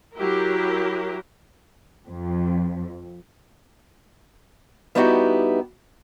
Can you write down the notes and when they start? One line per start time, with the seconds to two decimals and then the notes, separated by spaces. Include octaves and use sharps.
0.17 F#3 E4 G4 A#4
2.09 F2
4.95 G3 B3 D#4 E4 F#4 G4